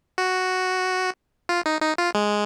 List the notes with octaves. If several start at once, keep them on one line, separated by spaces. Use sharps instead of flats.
F#4
F4
D#4
D#4
F4
G#3